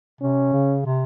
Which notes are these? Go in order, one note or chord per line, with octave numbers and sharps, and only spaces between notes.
C3 C#4
C#3
C3